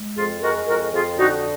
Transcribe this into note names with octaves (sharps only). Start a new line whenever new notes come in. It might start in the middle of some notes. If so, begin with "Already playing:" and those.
Already playing: G#3
F2 F4 G#4
G#3 F#4 A#4
F2 F#4 A#4
F2 F4 G#4
D3 D#4 F#4